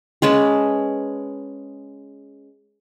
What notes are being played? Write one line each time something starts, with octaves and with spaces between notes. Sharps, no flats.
G#3 C#4 B4 A5